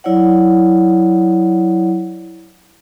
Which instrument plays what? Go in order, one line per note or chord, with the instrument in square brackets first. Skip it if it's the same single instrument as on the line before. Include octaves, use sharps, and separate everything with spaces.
[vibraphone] F#3 E4 C#5 D5 F#5